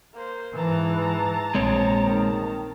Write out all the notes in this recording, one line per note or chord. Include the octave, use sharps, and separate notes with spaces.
A#3 C5
G#2 E3 A5 A#5
A#1 G#3 C4 C#5
D#3